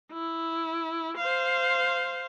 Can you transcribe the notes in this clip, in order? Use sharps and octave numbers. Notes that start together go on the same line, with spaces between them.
E4
C5 F5